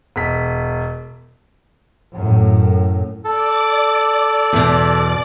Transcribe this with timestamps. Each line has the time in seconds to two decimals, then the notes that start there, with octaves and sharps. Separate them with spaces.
0.16 E1 B6
2.16 F#2 A2
3.24 A4 D5 D6
4.53 E2 B2